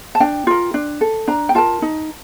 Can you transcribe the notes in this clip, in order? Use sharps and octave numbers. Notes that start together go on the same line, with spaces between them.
A5
D4 G5
F4 A#4
D4
A4
D4 A#5
G5
F4 A#4 A5
D#4